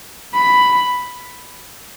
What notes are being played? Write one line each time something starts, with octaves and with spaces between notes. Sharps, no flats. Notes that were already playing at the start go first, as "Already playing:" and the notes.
B5